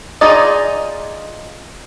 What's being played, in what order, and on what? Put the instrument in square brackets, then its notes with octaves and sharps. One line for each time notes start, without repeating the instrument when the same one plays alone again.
[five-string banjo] D#4 F4 G#4 D5 D#5